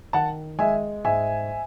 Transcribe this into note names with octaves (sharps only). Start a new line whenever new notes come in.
D#3 F#5 A5
G#3 E5 G#5
G#2 E5 G#5